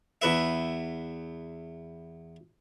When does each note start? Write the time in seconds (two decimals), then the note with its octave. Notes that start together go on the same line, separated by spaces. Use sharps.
0.22 E2 B4 E5